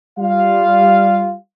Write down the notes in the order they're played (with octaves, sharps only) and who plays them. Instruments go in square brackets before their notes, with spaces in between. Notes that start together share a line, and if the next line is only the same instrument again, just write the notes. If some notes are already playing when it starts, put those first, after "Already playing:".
[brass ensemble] G3 F4 F5